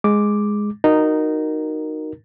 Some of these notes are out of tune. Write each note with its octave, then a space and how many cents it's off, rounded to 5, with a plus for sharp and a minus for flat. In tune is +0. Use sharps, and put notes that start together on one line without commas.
G#3 +0 D6 +0
D#4 -10 F#4 +0 A#4 +0